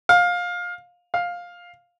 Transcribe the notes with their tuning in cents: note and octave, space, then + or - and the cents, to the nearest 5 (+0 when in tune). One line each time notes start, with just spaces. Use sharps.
F5 +20
F5 +10